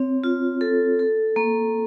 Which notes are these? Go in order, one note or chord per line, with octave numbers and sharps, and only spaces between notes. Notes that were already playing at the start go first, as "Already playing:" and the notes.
Already playing: C4 C#5
F4
A4
A4
A#3